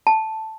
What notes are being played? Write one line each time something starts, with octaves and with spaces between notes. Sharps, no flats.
A5